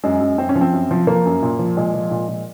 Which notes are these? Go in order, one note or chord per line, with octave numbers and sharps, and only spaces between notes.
F#2 G#3
F#2
F#2 C4
C#4
F3
C4
F#2
F3
F3 A#3
F#2
A#2
F3
A#2 G#3
F3
A#2
A#2